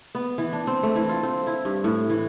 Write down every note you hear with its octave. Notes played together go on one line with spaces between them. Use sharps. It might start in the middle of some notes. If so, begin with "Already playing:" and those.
B3
E3
D4
C4
A3
E3
F4
C4
E4
G2
A2
E3